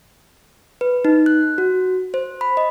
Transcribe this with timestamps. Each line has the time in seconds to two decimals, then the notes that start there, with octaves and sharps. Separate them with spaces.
0.81 B4
1.05 D#4
1.26 F#6
1.58 F#4
2.14 C5
2.41 B5
2.57 D#5